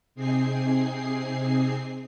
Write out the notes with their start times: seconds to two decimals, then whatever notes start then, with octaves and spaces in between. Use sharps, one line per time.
0.15 C3 C4 D#4 G#4 G#5 C7